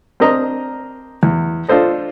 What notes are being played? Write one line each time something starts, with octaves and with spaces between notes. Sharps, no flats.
C4 D4 A#4 D#5 A#5
E2
D4 F4 A4 C5 D#5